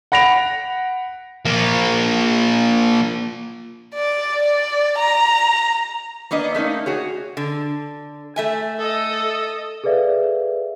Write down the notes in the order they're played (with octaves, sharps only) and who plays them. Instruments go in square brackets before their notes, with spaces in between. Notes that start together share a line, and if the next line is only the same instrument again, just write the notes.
[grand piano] F#5 B5 A#6 D7 F7
[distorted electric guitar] F3 A#3
[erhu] D5
D5
A#5
[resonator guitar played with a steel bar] A#3 B3 D4 D#5
A3 A#3 C#4 D#4
F#4 G#4 C#5
D3
A3 E5 G#5
[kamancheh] A4 D#5
[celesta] G#4 A4 B4 D5 E5 F5